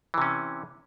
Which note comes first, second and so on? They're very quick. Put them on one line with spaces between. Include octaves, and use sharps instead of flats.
E3 C3 C#4